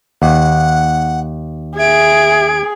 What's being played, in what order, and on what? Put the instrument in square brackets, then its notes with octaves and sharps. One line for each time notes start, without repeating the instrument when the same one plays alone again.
[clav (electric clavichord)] D#2 [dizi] F#5
[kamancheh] G#4 [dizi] E5 [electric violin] G#6 D7